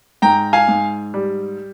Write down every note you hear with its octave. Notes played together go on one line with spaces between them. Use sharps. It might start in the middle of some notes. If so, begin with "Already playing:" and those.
G#2 G5 A#5
F5 G#5
G#2
G3